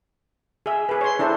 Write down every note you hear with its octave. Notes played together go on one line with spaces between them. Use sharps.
G#4 E5
G#4 B4
C#5 C6
D4 E4 A4 C5